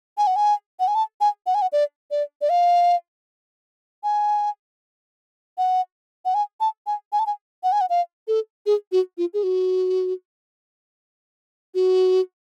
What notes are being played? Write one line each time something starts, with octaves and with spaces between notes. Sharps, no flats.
G#5
F#5
G#5
F#5
G#5
A5
G#5
F#5
G#5
F#5
D5
D5
D5
F5
G#5
F#5
F#5
G#5
A5
G#5
G#5
A5
G#5
F#5
G#5
F#5
F5
A4
G#4
F#4
F4
G#4
F#4
F#4